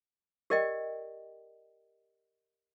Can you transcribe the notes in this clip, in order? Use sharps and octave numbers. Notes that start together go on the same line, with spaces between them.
G4 A#4 D5 D#5 G5